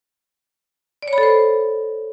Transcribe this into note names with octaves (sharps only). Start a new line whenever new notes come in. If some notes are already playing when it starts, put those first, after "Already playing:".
D5
C#5
B5
A4
C5